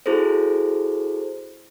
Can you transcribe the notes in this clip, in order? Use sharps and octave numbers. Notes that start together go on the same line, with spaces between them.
E4 F#4 G#4 A4 C5